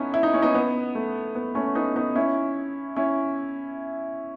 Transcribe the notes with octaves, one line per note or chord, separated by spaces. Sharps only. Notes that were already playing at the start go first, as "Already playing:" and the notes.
Already playing: B3 C#4 D#4 E4 A4
E4
D#4
C#4
B3 D#4
B3
A3
B3
A3 C#4
B3 D#4
B3 D#4
C#4 E4
C#4 E4